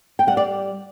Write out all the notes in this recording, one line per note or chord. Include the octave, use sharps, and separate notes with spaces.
G5
G3 F#5
D5